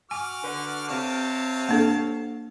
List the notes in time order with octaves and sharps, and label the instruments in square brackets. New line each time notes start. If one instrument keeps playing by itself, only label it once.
[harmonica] F#4 D6 F6 [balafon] G#5
[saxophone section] D3 B4
[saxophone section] C3 C4 [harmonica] C#5 F5 A5
[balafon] A#3 D4 A4